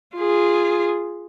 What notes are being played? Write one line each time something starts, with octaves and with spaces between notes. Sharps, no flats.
F4 G#4